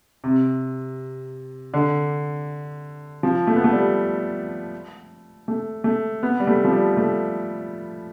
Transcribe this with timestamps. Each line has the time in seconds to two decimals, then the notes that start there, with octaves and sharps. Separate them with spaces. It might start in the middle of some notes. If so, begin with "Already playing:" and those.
0.24 C3
1.74 D3
3.23 F3
3.47 A3
3.56 B3
3.64 A3
3.72 G3
5.48 A3
5.84 A3
6.23 B3
6.40 G3
6.47 A3
6.64 F3
6.72 G3
6.97 A3